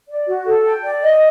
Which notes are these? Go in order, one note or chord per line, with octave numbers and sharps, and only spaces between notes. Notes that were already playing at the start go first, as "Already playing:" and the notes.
D5
F#4
A4
G5
D5
D#5